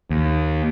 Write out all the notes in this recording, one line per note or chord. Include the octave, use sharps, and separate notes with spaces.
D#2